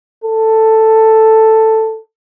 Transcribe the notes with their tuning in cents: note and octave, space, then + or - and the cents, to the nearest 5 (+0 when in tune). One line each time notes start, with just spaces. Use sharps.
A4 +5